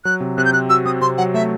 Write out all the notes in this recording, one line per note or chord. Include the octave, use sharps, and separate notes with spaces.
F#3 F#6
C3
C3 F#6
G6
C4 F#6
F#4 E6
C4 D#6
C3 C6
F#3 F#5
A3 E5